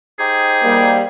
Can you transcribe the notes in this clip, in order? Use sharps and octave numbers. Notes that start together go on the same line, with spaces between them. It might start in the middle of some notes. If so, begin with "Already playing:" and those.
D#4 G4 G#4 C5
G3 A#3